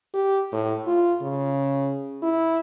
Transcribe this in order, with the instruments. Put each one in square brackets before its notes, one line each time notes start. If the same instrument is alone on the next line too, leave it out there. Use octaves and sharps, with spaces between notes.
[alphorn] G4
A2
F4
C#3
E4